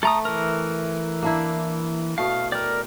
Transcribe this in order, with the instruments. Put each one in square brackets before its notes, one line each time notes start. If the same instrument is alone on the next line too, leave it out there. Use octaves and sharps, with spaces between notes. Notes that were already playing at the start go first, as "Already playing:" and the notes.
[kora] A3 [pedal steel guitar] A4 A#5 D#6
[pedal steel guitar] E3 A#4
[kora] A#3 D4 E4
[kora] B2 A3 [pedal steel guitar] F5
[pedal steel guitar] A#4 D5 [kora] G5